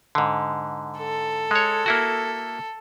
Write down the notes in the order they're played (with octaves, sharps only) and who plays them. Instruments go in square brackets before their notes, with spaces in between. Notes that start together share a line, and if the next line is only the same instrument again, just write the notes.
[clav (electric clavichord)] G#2 D3
[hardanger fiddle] A4
[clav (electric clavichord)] G#3 C#5
A#3 E4 F#4